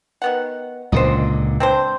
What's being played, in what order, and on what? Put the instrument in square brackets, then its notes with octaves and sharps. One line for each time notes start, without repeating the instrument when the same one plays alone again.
[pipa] D#3 B3 F#5
[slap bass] C#2 A#2 D3 [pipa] C5 D#5
[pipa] C4 D4 C5